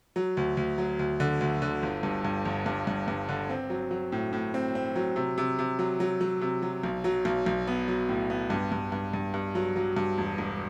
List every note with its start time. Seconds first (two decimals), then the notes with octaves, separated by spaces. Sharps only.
0.16 F#3
0.37 D2
0.57 D2
0.78 F#3
0.99 D2
1.20 D3
1.41 D2
1.62 D3
1.83 G1
2.03 G2
2.25 G2
2.45 G1
2.66 G2
2.87 G2
3.08 G2
3.29 D3
3.50 C4
3.70 F#3
3.91 F#3
4.12 A2
4.33 A2
4.54 C4
4.75 C4
4.96 F#3
5.16 C3
5.38 C3
5.59 C3
5.79 F#3
6.00 F#3
6.21 F#3
6.42 C3
6.62 F#3
6.83 B1
7.04 F#3
7.25 B1
7.46 B1
7.67 B3
7.88 F#3
8.09 A2
8.30 B3
8.50 G2
8.72 G2
8.92 G2
9.13 G2
9.34 G2
9.55 F#3
9.76 F#3
9.97 G2
10.18 E1
10.38 E1